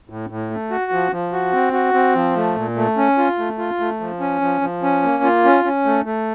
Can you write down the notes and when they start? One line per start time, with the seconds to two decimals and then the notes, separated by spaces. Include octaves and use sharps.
0.10 A2
0.30 A2
0.51 A3
0.71 F#4
0.92 F3
1.12 F3
1.33 F#4
1.53 C4
1.73 F#4
1.94 C4
2.15 F3
2.36 A3
2.56 A#2
2.77 A3
2.97 C#4
3.18 F4
3.39 A3
3.59 F4
3.80 A3
4.00 F3
4.20 C#4
4.41 F3
4.61 F3
4.83 C#4
5.03 A#3
5.24 F4
5.44 C#4
5.64 C#4
5.85 A3
6.06 A3